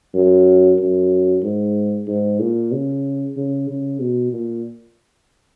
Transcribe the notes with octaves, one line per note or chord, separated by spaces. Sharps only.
F#2
F#2
G#2
G#2
A#2
C#3
C#3
C#3
B2
A#2